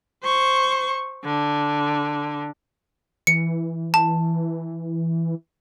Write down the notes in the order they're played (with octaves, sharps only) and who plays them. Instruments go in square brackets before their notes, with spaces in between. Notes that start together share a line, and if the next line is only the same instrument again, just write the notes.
[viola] C5 C#6
D3
[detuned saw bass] E3 [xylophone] C#7
[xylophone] A5